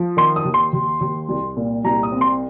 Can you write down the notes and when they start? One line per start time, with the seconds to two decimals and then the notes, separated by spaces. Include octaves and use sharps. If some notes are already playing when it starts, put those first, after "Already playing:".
Already playing: F3
0.17 D#3 C6
0.36 D#6
0.45 D#2
0.54 C6
0.73 D#2
1.01 D#2
1.29 C2
1.57 A#2
1.84 C2 A#5
2.03 D#6
2.12 C4
2.21 C6